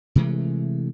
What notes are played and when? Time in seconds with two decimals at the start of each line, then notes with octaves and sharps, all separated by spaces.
0.15 C3 E3 G#3 A3